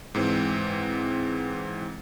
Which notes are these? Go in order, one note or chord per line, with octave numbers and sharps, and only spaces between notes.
G#2 E3 C4